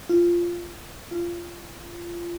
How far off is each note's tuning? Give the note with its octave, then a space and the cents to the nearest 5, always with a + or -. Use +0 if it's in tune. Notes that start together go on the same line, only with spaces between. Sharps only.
F4 -10
F4 -20